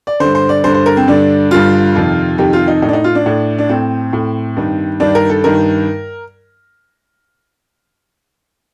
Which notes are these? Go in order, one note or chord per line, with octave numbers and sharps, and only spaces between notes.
D5
G2 D3 C5
C5
D5
G2 D3 C5
C5
A#4
C4
G2 D3 D4
G2 D3 F4
F2 C3 D#3
F2 C3 D#3 G4
F4
D#4
A2 D#4
D4
D#4
F4
D4
A2
D4
A2 C4
A2
G2 D#3
G2 D#3 D4
A#4
A4
G2 D#3 A#4